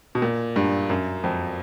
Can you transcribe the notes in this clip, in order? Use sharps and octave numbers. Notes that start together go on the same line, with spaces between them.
B2
A#2
G2
F#2
F2